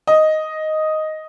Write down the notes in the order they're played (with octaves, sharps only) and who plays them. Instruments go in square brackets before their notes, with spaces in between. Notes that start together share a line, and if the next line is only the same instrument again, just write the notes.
[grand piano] D#5